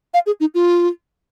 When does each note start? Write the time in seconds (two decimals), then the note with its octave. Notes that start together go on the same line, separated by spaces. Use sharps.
0.14 F5
0.26 G#4
0.40 D#4
0.55 F4